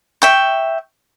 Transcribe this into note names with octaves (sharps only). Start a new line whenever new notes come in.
E5 G5 C#6